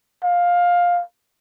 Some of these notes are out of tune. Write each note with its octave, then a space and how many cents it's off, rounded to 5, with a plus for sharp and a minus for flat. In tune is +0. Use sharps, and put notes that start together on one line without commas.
F5 +10